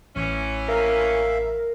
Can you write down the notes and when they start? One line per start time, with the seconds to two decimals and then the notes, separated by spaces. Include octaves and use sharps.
0.16 A1 E3 C#4
0.68 A#4 E5 F5